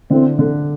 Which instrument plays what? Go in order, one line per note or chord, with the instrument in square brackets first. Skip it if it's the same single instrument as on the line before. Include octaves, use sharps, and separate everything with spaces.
[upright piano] D3 [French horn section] C4 E4
[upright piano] D3